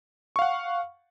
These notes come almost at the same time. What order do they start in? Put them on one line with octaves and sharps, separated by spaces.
C#6 F5 F#5